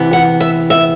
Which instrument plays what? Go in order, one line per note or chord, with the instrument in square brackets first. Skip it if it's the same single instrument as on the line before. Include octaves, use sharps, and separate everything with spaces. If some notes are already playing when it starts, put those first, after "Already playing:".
Already playing: [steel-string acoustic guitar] C3 E3 B3
F#5
E5
E5